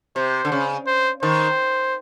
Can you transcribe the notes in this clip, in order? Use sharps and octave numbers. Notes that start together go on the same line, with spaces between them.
C3 C5
D3
C#3
C5
D#3 C5